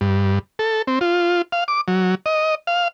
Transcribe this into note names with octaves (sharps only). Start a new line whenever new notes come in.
G2
A4
C4
F4
F5
D6
F#3
D#5
F5